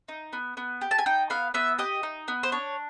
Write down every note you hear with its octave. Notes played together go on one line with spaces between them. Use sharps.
D#4
B3
B3
G4
A5
G#5
D#4 G5
B3 F5
B3 E5
G4 D#5
D#4
B3
C5
D4 C#5